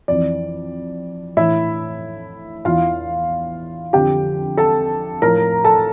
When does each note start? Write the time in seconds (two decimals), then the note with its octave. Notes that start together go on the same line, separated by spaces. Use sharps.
0.08 F2 E3 D5
1.37 A2 E3 E4 E5
2.65 E2 E3 F4 F5
3.93 F2 D3 F3 G4 G5
4.57 A4 A5
5.22 A2 F3 A#4 A#5
5.64 A4 A5